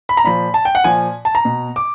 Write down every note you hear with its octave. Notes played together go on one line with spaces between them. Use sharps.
B5
A#5
A#2 F3 B5
A5
G5
F#5
A#2 F3 G#5
A5
A#5
B2
D6